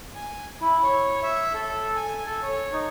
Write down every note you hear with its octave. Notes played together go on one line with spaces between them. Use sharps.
G#5
E4
C#5
E5
A4
G#5
A4
C#5
D#4